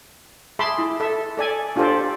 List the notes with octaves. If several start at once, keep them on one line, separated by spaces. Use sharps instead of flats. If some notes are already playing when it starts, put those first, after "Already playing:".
G#4 E5 A5 B5 C6 D6
E4
A4 E5
A4 D5 G#5
D4 F4 G4 A4 C5 D5